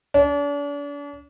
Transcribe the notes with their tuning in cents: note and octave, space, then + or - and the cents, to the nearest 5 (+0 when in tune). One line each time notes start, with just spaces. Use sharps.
D4 -40